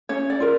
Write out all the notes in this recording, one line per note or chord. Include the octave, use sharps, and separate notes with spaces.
C#4 C#5
D5
F4 A#4